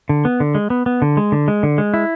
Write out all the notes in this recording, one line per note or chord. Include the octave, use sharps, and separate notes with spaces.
D3
B3
D3
G#3
B3
B3
D3
G#3
D3
G#3
D3
G#3
E4